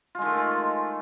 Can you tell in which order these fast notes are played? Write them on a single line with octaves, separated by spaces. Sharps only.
F4 G#3 D#3 A3